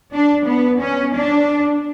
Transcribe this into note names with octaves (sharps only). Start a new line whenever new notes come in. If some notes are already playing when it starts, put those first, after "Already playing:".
D4
B3
C#4
D4